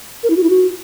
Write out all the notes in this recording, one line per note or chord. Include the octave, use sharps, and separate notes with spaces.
A#4
E4
F#4
E4
F#4